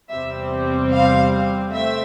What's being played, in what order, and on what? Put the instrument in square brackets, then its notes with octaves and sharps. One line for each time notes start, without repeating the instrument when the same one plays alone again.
[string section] E2 C3 G3 C4 E5
F5
A3 C4 E5